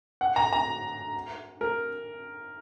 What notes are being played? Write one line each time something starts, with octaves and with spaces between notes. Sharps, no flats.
F#5
A#5
A#5
A#4